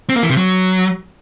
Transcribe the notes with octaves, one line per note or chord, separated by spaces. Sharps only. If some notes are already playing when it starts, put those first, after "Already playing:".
C4
A#3
E3
C3
F#3